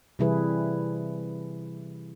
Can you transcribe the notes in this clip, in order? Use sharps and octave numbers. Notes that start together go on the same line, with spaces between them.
C3 E3 G3 E4 G#4 B4